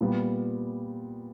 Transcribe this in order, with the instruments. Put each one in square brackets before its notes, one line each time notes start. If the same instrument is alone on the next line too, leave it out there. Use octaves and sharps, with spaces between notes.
[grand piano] A#2 G3 B3